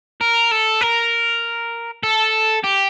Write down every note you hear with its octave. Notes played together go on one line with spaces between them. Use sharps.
A#4
A4
A#4
A4
G4